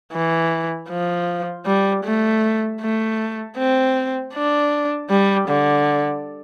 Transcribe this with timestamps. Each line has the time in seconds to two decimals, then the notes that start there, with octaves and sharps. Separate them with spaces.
0.13 E3
0.89 F3
1.66 G3
2.05 A3
2.81 A3
3.57 C4
4.34 D4
5.10 G3
5.49 D3